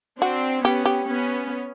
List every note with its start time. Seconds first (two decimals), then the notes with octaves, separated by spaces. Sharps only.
0.22 C4 D4 F#4
0.64 B3 C#4 G4
0.86 G4
1.07 B3 C#4